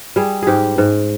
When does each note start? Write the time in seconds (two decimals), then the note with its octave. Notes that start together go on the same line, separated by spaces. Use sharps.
0.16 G3 G#4
0.43 G#2 G4 G#4
0.78 G#2